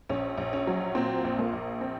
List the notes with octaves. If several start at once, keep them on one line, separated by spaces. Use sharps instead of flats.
A#1 C#4
A#1
C#4
F#3
A#2 C4
A#1
A#3
A#1
C4